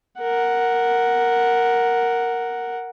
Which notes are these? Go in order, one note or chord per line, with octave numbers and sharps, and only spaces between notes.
A#4 F#5